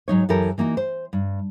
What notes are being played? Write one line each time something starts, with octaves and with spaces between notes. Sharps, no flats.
G#2 F#3 D#4 C#5
F#2 E3 E4 G4 A4 A#4
E3 A#3 D#4 F#4
C5
G2